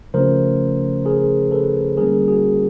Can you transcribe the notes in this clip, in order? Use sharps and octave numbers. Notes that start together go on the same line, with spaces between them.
C#3 F3 A3 C#4 A#4 C5
G#4 A#4
A4 B4
D3 G3 A#3 C#4 G#4 A#4
F#4 G#4